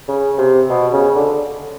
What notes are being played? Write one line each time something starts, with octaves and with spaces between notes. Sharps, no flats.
C#3
C3
B2
C#3
D3